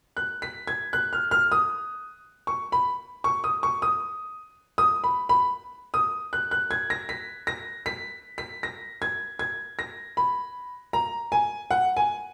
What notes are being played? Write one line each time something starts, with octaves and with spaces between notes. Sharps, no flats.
F#6
B6
G#6
F#6
F6
F6
D#6
C#6
B5
C#6
D#6
C#6
D#6
D#6
B5
B5
D#6
F#6
F#6
G#6
A#6
B6
A#6
B6
B6
A#6
G#6
G#6
A#6
B5
A#5
G#5
F#5
G#5